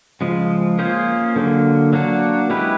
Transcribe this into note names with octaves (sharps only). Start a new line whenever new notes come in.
C#3 F3 G#3
A#3 C#4 F4 G#4 C5
D3 F#3 A#3
F#3 A#3 D4 F#4
G#3 C#4 E4 G4 B4